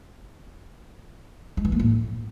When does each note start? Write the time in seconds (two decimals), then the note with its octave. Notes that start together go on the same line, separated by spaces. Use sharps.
1.57 G#3
1.65 E3
1.72 A#3
1.80 A2